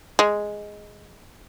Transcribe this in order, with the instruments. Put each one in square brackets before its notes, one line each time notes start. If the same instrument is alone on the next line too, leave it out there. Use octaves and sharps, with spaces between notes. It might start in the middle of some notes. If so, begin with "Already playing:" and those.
[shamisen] G#3